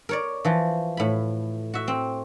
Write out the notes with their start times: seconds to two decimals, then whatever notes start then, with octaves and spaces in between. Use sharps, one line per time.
0.09 A#4 C#5 D5
0.45 E3 F3
0.97 A2 B5
1.74 F#4 E5
1.88 C4